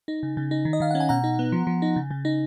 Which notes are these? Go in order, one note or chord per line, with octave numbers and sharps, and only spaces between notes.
D#4
C#3
C#3
D#4
D#3
D#5
D#3 F5
F#5
C#4
G#5
B2 F#5 A#5
D#4
B3
F3
F3
D#4
C#3
C#3
D#4